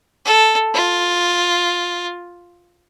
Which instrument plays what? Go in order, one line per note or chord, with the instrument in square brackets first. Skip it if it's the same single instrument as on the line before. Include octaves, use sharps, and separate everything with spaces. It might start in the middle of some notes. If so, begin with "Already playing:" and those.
[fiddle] A4
F4